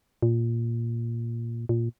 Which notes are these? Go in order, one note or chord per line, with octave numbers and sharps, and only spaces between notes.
A#2
A#2